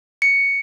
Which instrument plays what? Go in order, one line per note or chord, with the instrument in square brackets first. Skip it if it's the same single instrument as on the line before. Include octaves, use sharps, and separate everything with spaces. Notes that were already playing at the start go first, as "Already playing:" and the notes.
[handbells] C#7